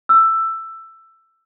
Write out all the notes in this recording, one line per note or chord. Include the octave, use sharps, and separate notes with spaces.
E6